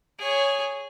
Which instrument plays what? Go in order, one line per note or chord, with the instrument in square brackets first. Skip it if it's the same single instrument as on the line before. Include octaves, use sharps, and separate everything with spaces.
[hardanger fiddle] G#4 C#5